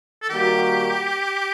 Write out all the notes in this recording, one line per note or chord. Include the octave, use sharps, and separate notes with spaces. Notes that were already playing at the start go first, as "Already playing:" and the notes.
A4
D#3 G3 A#3 F#4 G4 A#4